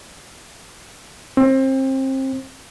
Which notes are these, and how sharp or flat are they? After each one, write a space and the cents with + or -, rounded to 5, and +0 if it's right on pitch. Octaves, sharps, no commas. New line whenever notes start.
C4 +30